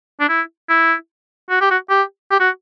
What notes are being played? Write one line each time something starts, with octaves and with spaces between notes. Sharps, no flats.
D4
E4
E4
F#4
G4
F#4
G4
G4
F#4